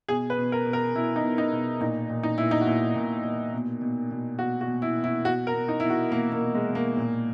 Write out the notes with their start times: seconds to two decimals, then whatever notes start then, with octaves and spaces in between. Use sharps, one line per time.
0.08 B2 G#4
0.30 B4
0.38 B2
0.52 A#4
0.66 B2
0.73 A#4
0.95 B2 E4
1.16 D#4
1.23 B2
1.38 D#4
1.52 B2
1.81 A#2 D#4
2.10 A#2
2.23 D#4
2.38 A#2 E4
2.51 D#4
2.61 F#4
2.67 A#2 E4
2.96 A#2
3.24 A#2
3.53 B2
3.82 B2
4.11 B2
4.39 B2 F#4
4.61 F#4
4.67 B2
4.82 E4
4.97 B2
5.04 E4
5.25 B2 F#4
5.47 A#4
5.54 B2
5.68 D#4
5.80 B2 E4
5.90 F#4
6.11 B2 A#3
6.32 A#3
6.39 B2
6.55 G#3
6.69 B2
6.75 A#3
6.97 A#2